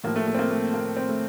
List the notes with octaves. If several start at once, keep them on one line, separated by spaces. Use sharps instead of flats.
A2 F3 A#3
A3
A3
C4
A#3
A3
A#3
C4
A3